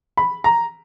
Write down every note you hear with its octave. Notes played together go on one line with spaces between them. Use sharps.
B5
A#5